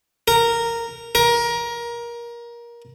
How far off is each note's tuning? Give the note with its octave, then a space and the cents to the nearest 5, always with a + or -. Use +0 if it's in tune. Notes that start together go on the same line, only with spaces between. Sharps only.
A#4 -10
A#4 +20